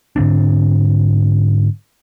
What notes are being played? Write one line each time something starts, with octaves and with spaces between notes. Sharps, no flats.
G#2 D3 C4 D4